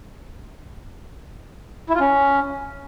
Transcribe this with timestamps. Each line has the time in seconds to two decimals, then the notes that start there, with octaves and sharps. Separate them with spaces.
1.89 E4
1.95 F4
2.00 C#4